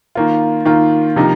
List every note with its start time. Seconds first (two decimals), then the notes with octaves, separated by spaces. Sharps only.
0.15 D#3 A#3 F4
0.65 D#3 A#3 F4
1.16 C3 F3 A#3 D#4